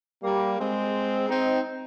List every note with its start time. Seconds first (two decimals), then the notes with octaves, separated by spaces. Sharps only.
0.23 G3 A#3
0.58 G#3 C4
1.29 C4 D#4